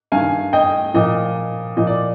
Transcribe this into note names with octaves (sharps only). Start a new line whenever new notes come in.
G2 D#3 F5 G#5
D#5 G5
A#2 F3 D#5
A#2 F3 D#5
D5